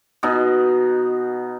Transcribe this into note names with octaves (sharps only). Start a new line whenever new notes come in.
B2 D#4